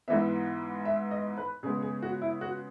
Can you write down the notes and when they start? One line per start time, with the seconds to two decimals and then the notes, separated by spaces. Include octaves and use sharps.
0.08 G#2 E3 B3 E5
0.85 E5
1.11 D#5
1.38 B4
1.63 C#3 G#3 B3 G#4
1.82 G#4
2.02 F#4
2.22 E4
2.41 F#4